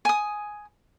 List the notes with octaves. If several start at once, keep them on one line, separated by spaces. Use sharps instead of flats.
G#5 D#6